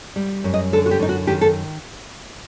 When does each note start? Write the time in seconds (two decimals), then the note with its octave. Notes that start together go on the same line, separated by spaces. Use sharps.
0.16 G3
0.44 F#2
0.54 D#5
0.72 D3 A4
0.86 F#4
0.91 G4
0.99 F#2 D#4
1.09 F#4
1.27 D#3 G4
1.41 A4